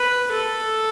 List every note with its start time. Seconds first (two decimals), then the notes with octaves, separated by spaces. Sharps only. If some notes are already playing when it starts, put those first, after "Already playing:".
Already playing: B4
0.32 A4